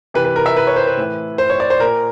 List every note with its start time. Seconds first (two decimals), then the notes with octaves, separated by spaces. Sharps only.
0.14 C3 E3 B4
0.25 B4
0.36 A#4
0.46 E5
0.57 B4
0.67 C#5
0.76 C5
0.87 B4
0.97 A2 E3
1.38 C5
1.50 C#5
1.60 D5
1.70 C5
1.80 A#2 A#4